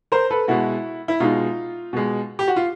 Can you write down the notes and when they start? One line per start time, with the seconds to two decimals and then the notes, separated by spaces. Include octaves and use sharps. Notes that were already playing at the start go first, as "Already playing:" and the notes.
0.12 A#4 C5
0.30 A4 B4
0.48 B2 G#3 E4 F#4
1.08 E4
1.20 B2 G#3 D#4 F4
1.93 B2 G#3
2.39 G4
2.48 F#4
2.56 F4